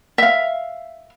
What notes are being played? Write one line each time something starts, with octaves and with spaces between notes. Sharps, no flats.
E5 F5